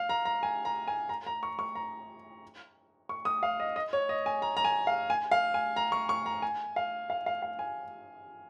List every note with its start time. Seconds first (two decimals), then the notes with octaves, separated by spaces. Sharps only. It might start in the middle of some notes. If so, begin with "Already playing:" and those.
Already playing: F5
0.09 A#5
0.25 A#5
0.43 G#5
0.65 A#5
0.88 G#5
1.09 A#5
1.27 A#5
1.43 C#6
1.59 C#6
1.75 A#5
3.09 C#6
3.25 D#6
3.43 F5
3.60 D#5
3.76 D#5
3.93 C#5
4.09 D#5
4.26 G#5
4.42 A#5
4.57 A#5
4.64 G#5
4.87 F5
5.10 G#5
5.31 F5
5.54 G#5
5.76 A#5
5.92 C#6
6.09 C#6
6.26 A#5
6.42 G#5
6.76 F5
7.10 F5
7.26 F5
7.42 F5
7.59 G#5